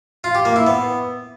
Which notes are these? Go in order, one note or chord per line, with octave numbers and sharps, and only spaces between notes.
F4
G4
A#3
E4
B3